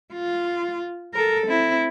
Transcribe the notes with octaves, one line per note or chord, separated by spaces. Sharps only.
F4
A4 A#4
C4 E4